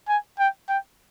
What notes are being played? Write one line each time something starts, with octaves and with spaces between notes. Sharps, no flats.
G#5
G5
G5